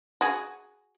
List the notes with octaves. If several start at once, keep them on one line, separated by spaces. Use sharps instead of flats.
F#4 G#4